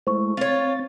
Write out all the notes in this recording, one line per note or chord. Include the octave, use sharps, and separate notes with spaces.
G#3 A3 E4 C5 C#6
C4 F4 C#5 A6